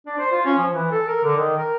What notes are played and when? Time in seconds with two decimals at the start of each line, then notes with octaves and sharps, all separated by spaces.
0.07 D4
0.19 C5
0.32 F4
0.45 C#4
0.58 F3
0.72 E3
0.92 A4
1.08 A#4
1.24 D3
1.37 D#3
1.58 A#4